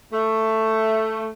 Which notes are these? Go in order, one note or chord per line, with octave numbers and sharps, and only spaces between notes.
A3